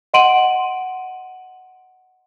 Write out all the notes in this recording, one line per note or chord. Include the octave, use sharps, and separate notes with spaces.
D#5 F#5 C6 D7 D#7 F#7